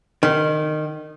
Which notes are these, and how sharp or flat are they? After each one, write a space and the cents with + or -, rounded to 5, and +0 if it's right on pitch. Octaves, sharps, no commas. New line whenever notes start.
D#3 -20